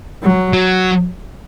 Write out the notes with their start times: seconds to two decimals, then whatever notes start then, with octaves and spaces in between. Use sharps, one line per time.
0.23 F#3
0.53 F#3